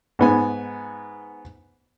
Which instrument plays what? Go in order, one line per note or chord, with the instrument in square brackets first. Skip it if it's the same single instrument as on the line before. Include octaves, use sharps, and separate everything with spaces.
[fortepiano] G#2 B3 G#5